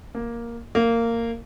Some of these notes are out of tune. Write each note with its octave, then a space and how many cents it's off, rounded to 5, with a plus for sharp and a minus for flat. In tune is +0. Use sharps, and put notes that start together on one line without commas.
A#3 +5
A#3 -15